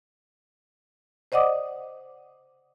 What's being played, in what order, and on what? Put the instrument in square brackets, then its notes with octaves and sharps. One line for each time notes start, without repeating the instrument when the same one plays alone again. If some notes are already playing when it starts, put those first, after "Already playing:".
[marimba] C5 D5 D#5 F#5 D6 D#6